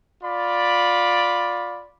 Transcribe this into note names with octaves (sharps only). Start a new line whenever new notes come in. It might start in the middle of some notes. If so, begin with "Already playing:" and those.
F4 D5 B5